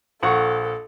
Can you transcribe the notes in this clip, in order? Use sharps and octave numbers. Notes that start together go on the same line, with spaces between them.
A#1 A4 F#5 C#6